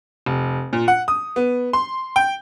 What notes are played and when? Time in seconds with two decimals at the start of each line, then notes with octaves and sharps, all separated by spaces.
0.26 F1
0.73 A#2
0.88 F#5
1.08 D#6
1.36 B3
1.73 C6
2.16 G5